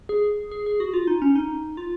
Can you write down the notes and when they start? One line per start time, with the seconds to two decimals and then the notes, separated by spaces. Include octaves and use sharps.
0.09 G#4
0.51 G#4
0.66 G#4
0.80 F#4
0.94 F4
1.07 D#4
1.22 C#4
1.36 D#4
1.77 F4